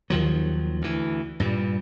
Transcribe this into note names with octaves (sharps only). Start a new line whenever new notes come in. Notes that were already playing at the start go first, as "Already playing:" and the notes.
D#2 D#3 F3 F#3
D2 E3
G2 A#2 G3